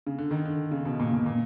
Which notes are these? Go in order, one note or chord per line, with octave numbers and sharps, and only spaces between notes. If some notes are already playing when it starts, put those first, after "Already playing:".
C#3
D3
D#3
D3
C#3
B2
A#2
A#2
A#2